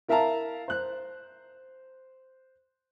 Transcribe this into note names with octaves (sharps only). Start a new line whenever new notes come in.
E4 A#4 E5 F5 A5 A#5
C5 F#6